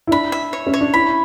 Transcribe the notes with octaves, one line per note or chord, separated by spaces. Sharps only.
E4
D4 B5
E5
C#5
C#4
C#5
D4
E4 B5